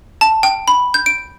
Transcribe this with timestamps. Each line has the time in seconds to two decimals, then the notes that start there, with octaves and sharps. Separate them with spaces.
0.21 A5
0.43 G5
0.68 B5
0.94 G6
1.06 D7